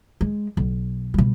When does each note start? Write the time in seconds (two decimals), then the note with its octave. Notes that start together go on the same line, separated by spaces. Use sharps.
0.21 G#3
0.57 B1
1.14 B2 G3